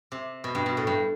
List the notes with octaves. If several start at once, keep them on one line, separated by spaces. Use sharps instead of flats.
C3
B2
G2
B2
A2
G2